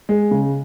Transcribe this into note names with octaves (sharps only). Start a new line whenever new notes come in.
G#3
C#3